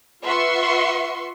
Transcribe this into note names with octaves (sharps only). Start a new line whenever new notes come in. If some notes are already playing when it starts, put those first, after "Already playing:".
F4 B4 E5 F#5 C6 C#6